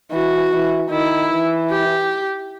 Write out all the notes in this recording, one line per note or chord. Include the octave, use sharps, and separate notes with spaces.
E3 F#4
E3
D#3 E4
E3
G4